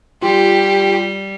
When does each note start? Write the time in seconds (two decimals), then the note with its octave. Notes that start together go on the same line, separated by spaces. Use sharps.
0.22 G3 F4 G4